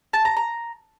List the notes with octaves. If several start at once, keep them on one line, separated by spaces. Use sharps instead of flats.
A5
A#5
A#5